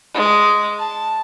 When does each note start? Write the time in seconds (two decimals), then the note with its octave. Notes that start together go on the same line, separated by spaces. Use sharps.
0.14 G#3
0.78 A5